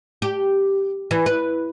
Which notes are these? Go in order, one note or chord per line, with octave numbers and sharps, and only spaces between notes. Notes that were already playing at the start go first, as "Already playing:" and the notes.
G4
E3
B4